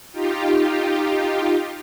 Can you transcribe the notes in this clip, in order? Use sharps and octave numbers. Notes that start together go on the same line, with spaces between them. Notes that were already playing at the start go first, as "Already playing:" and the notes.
D#4 F4 G4